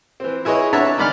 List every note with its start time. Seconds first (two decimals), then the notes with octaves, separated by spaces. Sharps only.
0.20 E3 C4
0.45 E4 G#4 B4 C#5 D#5
0.73 D4 C#5 E5 F#5 A5 A#5
0.98 C#2 D#3 D5 B5 F6